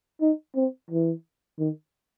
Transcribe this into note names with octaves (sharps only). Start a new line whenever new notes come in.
D#4
C4
E3
D#3